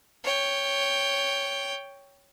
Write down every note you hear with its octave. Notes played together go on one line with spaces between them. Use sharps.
C#5 G5